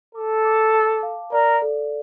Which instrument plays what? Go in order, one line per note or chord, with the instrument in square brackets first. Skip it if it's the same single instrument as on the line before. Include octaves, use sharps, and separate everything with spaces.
[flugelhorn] A4 [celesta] D6
[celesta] D6
A5
F5
[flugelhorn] A#4 [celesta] D5
[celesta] A4